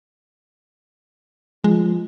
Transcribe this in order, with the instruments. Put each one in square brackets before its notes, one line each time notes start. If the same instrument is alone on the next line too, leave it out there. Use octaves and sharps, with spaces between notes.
[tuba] F3 [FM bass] G#3